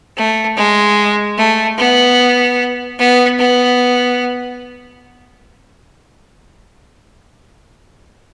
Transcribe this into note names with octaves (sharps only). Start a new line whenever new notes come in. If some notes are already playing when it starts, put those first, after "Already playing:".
A3
G#3
A3
B3
B3
B3